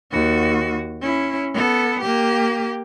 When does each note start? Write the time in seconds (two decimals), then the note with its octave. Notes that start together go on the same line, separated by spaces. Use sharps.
0.11 D#2 F#4
1.01 C#4 E4
1.54 B3 A4
2.01 A#3 G4